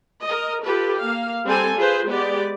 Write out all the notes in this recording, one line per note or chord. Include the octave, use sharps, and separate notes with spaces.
A#4 D#5
F4 G4 A4 B4
A#3 F5
G3 C4 A4 G#5
F4 G#4 B4 C5
G#3 B3 G4 D5